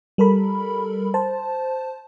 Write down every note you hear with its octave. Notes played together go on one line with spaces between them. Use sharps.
G3 A4 A#4 B5
C5 A5